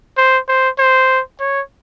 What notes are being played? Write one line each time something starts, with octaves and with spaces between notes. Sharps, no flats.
C5
C5
C5
C#5